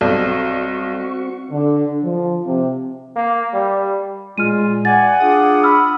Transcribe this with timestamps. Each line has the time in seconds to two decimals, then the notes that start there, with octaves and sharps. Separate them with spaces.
0.01 B1 G3 C4 F#4 A4 D5 C#6
1.51 D3
2.02 F3
2.45 C3
3.16 A#3
3.54 G3
4.38 A#2 G#3 F4 F6 D#7
4.85 D5 F#5 G#5 A6
5.20 D4 F4 G#4 D#6
5.64 B5 E6 F6